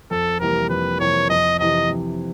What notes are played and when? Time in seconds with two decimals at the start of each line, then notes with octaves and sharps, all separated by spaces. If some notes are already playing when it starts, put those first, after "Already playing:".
0.11 F2 A4
0.40 C3 E3 G3 A#3 A#4
0.70 F2 B4
1.00 C3 E3 G3 A#3 C#5
1.29 F2 D#5
1.59 C3 E3 D#5
1.89 F2